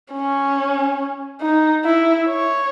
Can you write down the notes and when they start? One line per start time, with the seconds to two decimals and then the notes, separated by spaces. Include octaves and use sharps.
0.13 C#4
1.41 D#4
1.84 E4
2.28 C#5